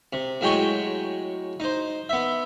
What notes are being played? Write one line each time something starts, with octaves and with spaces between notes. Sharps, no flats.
C3
A2 F#3 G#3 G5 G#5 C#6
D#4 C5
B3 E5